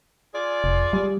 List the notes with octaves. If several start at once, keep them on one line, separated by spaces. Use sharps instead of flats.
F4 G#4 D5
F1
G3